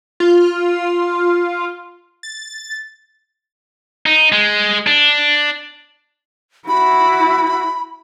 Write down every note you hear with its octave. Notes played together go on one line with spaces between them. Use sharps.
F4
A6
D#4
G#3
D4
E4 F#4 B5